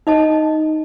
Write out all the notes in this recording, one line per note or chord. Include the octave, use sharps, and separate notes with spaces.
D#4 D#5 A5